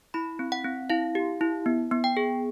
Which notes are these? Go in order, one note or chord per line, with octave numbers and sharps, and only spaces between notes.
E4 B5
C4
F#5
C4
E4 F5
G4
E4
B3
B3
G5
G#4